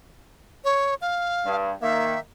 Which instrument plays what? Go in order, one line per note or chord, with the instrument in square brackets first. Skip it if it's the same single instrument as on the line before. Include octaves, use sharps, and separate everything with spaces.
[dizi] C#5
F5
[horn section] G2
[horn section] D#3 A#3 [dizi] E5